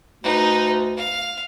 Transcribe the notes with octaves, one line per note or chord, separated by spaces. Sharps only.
D2 D#4 B4
F5